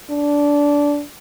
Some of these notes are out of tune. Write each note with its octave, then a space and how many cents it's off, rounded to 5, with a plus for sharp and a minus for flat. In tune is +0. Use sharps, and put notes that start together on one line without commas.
D4 -15